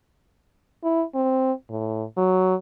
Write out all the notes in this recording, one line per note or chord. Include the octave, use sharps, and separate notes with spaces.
E4
C4
A2
F#3